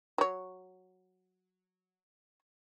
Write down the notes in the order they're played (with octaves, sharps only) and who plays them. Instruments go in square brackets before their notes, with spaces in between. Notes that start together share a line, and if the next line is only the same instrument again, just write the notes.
[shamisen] F#3 C#5